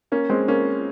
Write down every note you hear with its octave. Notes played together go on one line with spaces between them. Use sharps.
A#3 C#4
G#3 C4
A#3 C#4